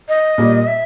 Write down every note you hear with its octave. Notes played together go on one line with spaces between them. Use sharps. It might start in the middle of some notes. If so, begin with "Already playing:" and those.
D#5
A#2 G3 A#3
E5